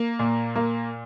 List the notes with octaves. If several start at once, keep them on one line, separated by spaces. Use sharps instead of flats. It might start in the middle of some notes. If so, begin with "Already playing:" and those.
Already playing: A#3
A#2
A#3